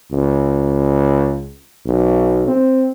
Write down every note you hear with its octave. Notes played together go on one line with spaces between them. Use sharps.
C#2
B1
C4